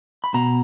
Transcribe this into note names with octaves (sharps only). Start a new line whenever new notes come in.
B5
B2 A#5